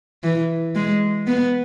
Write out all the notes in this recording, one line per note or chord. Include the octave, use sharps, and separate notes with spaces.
E3
G#3
B3